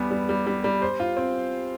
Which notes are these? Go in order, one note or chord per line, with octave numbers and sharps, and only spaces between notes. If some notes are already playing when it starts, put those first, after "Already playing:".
Already playing: E2 G3 B3
G3
G3
G3
G3
C5
F4
C4